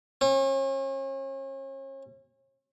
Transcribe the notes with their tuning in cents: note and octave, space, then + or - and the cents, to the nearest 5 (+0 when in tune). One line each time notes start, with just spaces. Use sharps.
C#4 -40